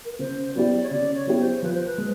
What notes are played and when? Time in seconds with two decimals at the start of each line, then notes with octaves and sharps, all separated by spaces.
0.05 A#4
0.13 B4
0.19 C#3 C5
0.55 F#3 B3 E4 G4 D5
0.83 C#5
0.91 C#3 D5
1.14 C#5
1.27 F#3 B3 E4 G4
1.39 C5
1.62 F3 B4
1.73 C5
1.85 B4
1.98 G#3